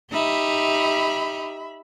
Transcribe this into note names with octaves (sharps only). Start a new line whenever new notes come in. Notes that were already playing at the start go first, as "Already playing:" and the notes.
D#4 G4 E5 B5